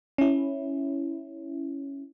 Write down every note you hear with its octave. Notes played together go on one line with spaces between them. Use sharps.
C#4 E4